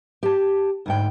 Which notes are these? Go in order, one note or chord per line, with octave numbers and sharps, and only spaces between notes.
G4 A5
D2 G#2 G5